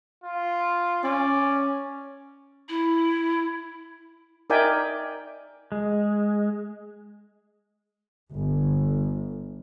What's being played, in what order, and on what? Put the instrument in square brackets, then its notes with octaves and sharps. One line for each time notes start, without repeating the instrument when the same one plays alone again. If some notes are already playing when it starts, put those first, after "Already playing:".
[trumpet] F4
[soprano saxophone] C#4 [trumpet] D5
[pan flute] E4
[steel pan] D#4 A#4 D5 E5 G5 G#5
[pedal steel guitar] G#3
[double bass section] G1